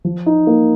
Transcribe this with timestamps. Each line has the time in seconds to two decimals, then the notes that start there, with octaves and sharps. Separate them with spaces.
0.05 F3
0.26 D#4
0.47 A#3